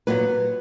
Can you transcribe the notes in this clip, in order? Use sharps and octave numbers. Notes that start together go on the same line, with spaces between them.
A#2 F#3 B3 B4